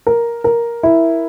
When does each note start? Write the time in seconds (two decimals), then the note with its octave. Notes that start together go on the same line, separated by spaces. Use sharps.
0.07 A#4
0.44 A#4
0.83 E4